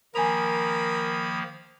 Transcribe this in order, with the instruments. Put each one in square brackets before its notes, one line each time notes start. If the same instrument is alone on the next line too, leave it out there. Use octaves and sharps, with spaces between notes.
[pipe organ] D#3 F3 A#3 [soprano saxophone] A#4 [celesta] G#5 F7 [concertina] B5 D#6